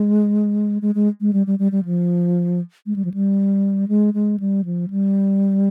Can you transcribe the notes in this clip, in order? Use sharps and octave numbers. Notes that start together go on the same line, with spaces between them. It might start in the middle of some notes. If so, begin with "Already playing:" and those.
Already playing: G#3
G#3
G#3
G#3
G3
G3
G3
G3
F3
G#3
G3
F3
G3
G#3
G#3
G3
F3
G3